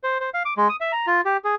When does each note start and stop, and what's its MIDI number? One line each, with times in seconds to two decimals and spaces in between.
0.04 0.18 72
0.20 0.30 72
0.34 0.43 77
0.45 0.54 86
0.57 0.68 56
0.69 0.76 87
0.81 0.92 76
0.92 1.06 82
1.07 1.21 65
1.25 1.37 67
1.44 1.55 68